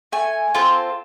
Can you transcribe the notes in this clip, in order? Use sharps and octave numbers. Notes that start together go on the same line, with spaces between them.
A3 G#5
C4 F4 A4